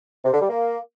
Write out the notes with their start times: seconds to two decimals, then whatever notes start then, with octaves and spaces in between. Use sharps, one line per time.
0.25 C3
0.33 D3
0.41 G3
0.49 A#3